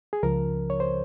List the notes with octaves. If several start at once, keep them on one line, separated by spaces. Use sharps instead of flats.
G#4
C#2 C#3 F3 A#4
C#5
C5